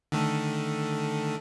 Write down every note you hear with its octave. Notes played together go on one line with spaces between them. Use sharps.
D3 D#3 A3